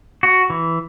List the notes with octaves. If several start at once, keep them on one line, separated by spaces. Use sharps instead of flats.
F#4
E3